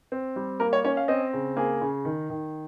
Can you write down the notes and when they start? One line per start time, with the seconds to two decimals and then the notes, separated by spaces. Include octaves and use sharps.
0.12 C4
0.36 G3
0.60 A#3 A#4
0.73 C#5
0.85 C#4 C#5
0.97 F5
1.08 C4 D#5
1.33 C#3
1.56 A#3 G#4
1.82 C#3
2.05 D#3
2.30 D#3